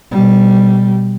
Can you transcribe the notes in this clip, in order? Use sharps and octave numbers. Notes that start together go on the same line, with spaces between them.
B2 G3